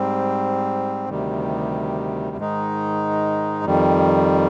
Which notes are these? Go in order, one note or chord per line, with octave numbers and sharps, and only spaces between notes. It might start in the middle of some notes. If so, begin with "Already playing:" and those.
Already playing: G#2 G3 C4
D2 C3 D#3 G3
G#2 D#3 G#3 D#4
F2 D#3 G3